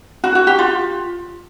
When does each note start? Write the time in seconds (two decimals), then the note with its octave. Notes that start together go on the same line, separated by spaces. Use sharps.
0.24 F#4
0.35 F#4
0.47 G4
0.59 F4